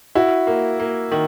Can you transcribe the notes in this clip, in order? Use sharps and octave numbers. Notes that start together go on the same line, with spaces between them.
E4 F#4
A#3
A#3
D#3